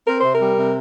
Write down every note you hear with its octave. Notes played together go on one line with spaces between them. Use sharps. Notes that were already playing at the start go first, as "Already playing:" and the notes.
C4 A#4
C3 C5
A#4
G3
C3